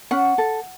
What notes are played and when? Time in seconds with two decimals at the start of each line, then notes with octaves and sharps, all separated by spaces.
0.11 C#4 F#5
0.38 A4